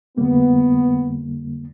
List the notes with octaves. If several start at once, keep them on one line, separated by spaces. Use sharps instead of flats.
F2 D3 G3 A#3 B3